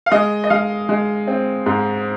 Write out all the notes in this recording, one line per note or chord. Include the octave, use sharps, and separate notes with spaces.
F5
G#3 D#5
D#5
G#3 F5
G#3
C4
G#2